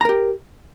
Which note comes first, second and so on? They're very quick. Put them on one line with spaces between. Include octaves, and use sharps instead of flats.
A#5 A#4 G4